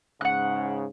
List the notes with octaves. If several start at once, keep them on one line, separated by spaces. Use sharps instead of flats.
G#2 C#3 F#5 F#6